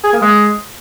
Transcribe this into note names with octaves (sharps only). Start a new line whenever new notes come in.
G#4
A#3
G#3